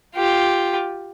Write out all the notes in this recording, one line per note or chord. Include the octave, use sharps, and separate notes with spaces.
F4 G4